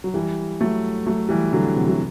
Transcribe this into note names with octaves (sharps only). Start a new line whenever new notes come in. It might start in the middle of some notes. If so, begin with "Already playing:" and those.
F#3
E3 G3
F#3 A3
F#3 A3
E3 G3
D3 F#3
C3 E3
F#3